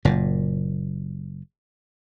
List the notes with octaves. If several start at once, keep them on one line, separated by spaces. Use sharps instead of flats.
F#1 A#2